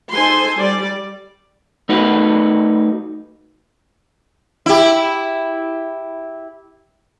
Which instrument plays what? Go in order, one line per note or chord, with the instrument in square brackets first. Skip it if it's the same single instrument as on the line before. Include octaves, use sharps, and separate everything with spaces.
[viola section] D#4 A4 C5 G#5 C6
G3 D5
[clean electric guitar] A3 D#4 F#4 B4
[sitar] E4 G4